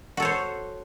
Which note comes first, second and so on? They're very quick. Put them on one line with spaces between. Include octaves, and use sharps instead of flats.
F#4 A4 C#5 C5